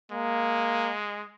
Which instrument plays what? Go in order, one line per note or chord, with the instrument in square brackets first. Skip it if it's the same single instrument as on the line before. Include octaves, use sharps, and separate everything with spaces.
[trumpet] G#3 [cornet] A#3